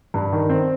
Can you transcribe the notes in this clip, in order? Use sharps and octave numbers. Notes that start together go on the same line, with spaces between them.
G2
D#3
C4